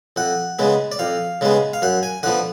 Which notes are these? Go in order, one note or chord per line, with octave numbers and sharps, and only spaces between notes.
F2 F#5
C#3 G#3 B3
D5
F2 F5
C#3 G#3 B3
F5
F#2 F#5
G#5
D3 F3 B3 F#5